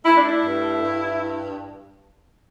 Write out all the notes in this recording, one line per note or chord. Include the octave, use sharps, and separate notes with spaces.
A3 E4
D4
E4
G2
G2